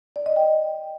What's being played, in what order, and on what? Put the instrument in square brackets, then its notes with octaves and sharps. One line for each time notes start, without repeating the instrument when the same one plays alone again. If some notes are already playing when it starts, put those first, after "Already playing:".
[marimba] D5
D#5
G5